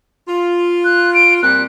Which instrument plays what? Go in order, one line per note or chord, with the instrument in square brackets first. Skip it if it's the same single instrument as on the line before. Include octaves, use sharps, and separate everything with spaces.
[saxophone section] F4
[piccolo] F#6
D7
[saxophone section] A#2 G3 C4 [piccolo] F#6